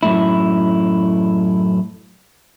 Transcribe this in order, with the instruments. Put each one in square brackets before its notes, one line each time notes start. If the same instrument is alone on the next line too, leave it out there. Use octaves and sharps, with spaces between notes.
[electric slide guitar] F#2 A2 E4